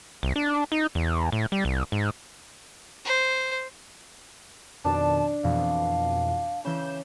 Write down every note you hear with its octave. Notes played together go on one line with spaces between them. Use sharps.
C2
D4
D#4
E2
A2
G3
C2
G#2
C5
F2 B2 D#3 D4 A5
F2 B2 E3 F5
C#3 E3 G6 E7